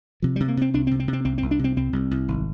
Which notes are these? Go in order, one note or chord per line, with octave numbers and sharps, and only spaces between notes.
C3 F3
C3 G3
A#3
C3 C4
C2 D4
C4
C3
C4
C3
C4
C2 C4
C2 C4
D4
C3
C4
C2 C4
C2
C2
G#1